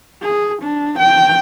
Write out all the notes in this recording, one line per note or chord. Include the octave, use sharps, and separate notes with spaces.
G#4
D4
G5